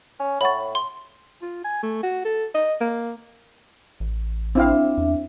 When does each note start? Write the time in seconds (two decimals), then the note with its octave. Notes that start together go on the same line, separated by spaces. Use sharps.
0.20 C#4
0.41 A2 C#5 F#5 B5 C#6 A6
0.75 C6
1.42 F4
1.64 G#5
1.83 A3
2.03 F#4
2.25 A4
2.55 D#5
2.81 A#3
4.00 A1
4.55 C4 D4 E4 E5 F5
4.98 E2